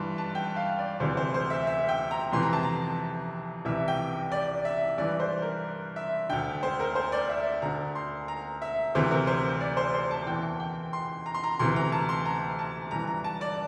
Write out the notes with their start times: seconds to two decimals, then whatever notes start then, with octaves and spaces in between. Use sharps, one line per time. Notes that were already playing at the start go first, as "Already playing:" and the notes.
Already playing: G2 E3 C6
0.18 A5
0.35 G5
0.56 F5
0.79 D5
1.00 D2 C3 E3 C5
1.17 C5
1.34 C5
1.50 E5
1.67 E5
1.89 G5
2.11 A#5
2.32 F2 C3 E3 C6
2.43 A#5
2.53 A5
2.63 A#5
3.65 C2 C3 E3 E5
3.88 G5
4.32 D5
4.65 E5
4.98 G2 E3 D5
5.20 C5
5.42 A#4
5.96 E5
6.29 D2 D3 G5
6.63 C5
6.80 A#4
6.95 C5
7.12 D5
7.30 E5
7.62 D2 D3 A#5
7.95 C6
8.28 A#5
8.62 E5
8.95 D2 C3 E3 C5
9.11 A#4
9.27 C5
9.60 D5
9.77 C5
9.94 C5
10.11 A5
10.26 E2 E3 G5
10.60 G5
10.93 C6
11.26 A#5
11.34 C6
11.44 A#5
11.59 D2 C3 E3 C6
11.76 A#5
11.92 A5
12.09 C6
12.26 A#5
12.59 A5
12.91 G2 E3 A#5
13.07 A#5
13.24 A5
13.41 D5